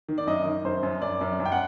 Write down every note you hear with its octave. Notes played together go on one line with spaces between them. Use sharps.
D#3
D5
F#2 D#5
D#3
F#2 C5
F#2
F#2 D5
F#2
D5
F#2
G5
F#5